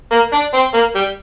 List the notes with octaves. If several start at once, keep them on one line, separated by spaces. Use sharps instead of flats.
A#3
D4
C4
A#3
G3